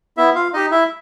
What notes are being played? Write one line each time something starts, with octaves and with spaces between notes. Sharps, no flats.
B3 E4 E5
F4 F5
D#4 G4 D#5
E4 E5